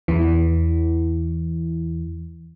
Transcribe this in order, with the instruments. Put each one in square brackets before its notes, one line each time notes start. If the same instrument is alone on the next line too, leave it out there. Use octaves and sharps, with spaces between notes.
[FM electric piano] E2 E3